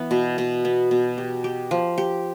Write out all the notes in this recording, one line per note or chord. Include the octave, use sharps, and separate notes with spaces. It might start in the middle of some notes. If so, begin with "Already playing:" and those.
Already playing: E3 B3
B2
B2
B3
B2
G4
G4
F3
G4